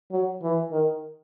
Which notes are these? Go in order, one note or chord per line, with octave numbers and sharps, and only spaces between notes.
F#3
E3
D#3